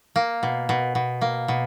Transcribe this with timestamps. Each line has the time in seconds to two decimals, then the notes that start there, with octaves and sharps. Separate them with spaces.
0.16 A#3
0.43 B2
0.69 B2
0.95 B2
1.21 A#3
1.48 B2